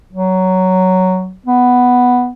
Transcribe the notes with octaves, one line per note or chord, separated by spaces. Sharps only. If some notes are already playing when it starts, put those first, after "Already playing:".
F#3
B3